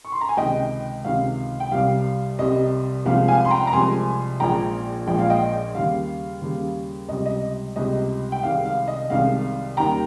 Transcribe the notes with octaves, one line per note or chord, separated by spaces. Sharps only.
C#6
C6
A#5
G#5
C#2 C3 D#3 D#5 G5
C#2 C3 D#3 F5
G5
C2 C3 G3 F5
C2 C3 G3 D#5
C2 C3 F3 G#3 F5
F5 G#5
C6
G5 A#5
A#5
C2 C3 F3 G#3 G#5 C6
A#1 A#2 F3 G#3 G5 A#5
A#1 A#2 F3 G#3 G5
F5
D#5 G5
D#2 C#3 G3 F5
D#2 C#3 G3
C#2 C3 G3 D#5
D#5
C#2 C3 G3 D#5
G5
C2 C3 D#3 G#3 F5
F5
D#5
C2 C3 D#3 G#3 F5
D#2 D#3 G3 G5 A#5